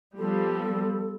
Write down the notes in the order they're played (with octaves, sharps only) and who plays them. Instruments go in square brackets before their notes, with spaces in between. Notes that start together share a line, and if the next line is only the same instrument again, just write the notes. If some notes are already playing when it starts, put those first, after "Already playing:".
[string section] F3 G3 B3 [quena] A4